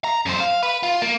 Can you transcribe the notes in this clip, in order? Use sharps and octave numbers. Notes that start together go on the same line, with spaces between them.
A#5
F#2 C5
F5
B4
F4
A#3